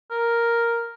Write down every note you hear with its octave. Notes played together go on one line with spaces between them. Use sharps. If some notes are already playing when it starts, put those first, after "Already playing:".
A#4